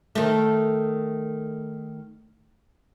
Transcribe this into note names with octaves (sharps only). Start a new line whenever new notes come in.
D#3 A3